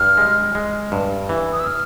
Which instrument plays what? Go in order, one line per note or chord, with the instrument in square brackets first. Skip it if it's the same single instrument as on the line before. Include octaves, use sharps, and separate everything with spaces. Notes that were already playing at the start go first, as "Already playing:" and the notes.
Already playing: [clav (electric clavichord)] G2 [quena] F6
[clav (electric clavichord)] G#3
G#3
G2
E3
[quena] D#6
E6
F6